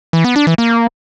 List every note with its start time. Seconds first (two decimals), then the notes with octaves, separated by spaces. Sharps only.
0.13 E3
0.24 B3
0.36 D4
0.47 E3
0.58 A#3